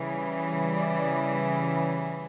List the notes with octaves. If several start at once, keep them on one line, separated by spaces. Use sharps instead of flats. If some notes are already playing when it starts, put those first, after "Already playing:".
Already playing: C#3 E3 G3
D5